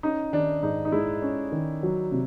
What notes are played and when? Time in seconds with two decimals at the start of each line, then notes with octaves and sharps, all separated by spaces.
0.03 C#4 D#4
0.33 D#3 D4
0.62 G#2 D#4
0.85 D#4
0.92 G#3 E4
1.22 C#4
1.52 D#3
1.83 F#3
2.12 C3